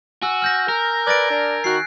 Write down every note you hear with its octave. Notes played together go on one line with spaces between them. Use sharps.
F#4 G#5 E6
F6 G6 A#6
A#4
B4 D5 G#6 A6 D7
D4
D#3 F#4 F#6 C7